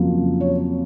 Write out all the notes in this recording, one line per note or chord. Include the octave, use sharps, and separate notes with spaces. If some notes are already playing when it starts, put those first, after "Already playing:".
Already playing: F2 C#3 F#3 A#3 F4
C#5